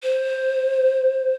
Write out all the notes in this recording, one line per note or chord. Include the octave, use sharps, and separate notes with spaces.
C5